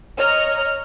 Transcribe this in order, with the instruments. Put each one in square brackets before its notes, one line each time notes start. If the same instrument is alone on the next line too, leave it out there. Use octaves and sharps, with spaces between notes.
[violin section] C#5 D#5 A#5 F6